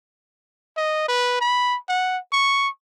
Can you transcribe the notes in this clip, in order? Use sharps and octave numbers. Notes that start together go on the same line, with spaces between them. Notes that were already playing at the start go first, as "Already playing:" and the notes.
D#5
B4
B5
F#5
C#6